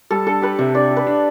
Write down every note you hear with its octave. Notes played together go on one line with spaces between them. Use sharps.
G3 A4
D4 A4
G4 B4
C3 E5
D4 D5
G4
B4
D4